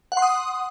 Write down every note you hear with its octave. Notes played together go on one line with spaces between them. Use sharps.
F#5
C6
D#6